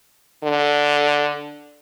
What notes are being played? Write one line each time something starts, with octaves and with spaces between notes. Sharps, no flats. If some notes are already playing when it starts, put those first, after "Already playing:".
D3